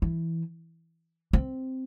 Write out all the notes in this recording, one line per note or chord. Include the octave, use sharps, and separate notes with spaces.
E3
C4